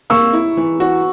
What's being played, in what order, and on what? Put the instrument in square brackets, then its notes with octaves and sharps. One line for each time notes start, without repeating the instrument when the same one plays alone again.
[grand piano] A#3 [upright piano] C#6 E6
[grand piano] E4
E3
F#4